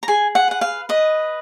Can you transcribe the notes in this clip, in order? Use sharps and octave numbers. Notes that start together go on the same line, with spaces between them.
A#5
G#4 G#5
F#5
B4 F#5
F5
B4 D#5